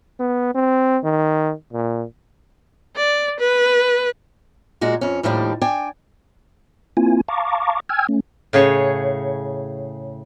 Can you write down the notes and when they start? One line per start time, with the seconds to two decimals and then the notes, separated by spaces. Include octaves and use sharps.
0.20 B3
0.55 C4
1.04 D#3
1.73 A#2
2.96 D5
3.40 B4
4.81 A#2 G#3 F#4
5.01 F2 C#4
5.23 D#2 A2 F3 G3 C4 D4
5.62 D4 G5 G#5
6.97 A#3 C4 E4 F4 G#5
7.28 F5 A5 A#5 C#6 D6
7.89 G5 G#5 E6 F6 G#6
8.09 A3 C#4
8.53 A2 C#3 G#4 C#5